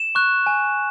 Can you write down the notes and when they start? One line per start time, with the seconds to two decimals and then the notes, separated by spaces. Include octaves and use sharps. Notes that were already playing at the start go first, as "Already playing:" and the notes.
Already playing: E7
0.15 C#6 F#6
0.46 G#5